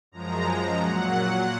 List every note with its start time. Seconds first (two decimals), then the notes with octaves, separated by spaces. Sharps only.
0.12 F#2 F3 G#3 A#5
0.81 A#2 F#3 F#5